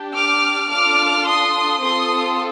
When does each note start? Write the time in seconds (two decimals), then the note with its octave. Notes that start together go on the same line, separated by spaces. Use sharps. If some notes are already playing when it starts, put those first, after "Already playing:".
Already playing: D4 G4
0.17 D6 F6
0.72 D4 F4 A4 D6 F6
1.28 C6 D#6
1.83 C4 F4 A4 C6 D#6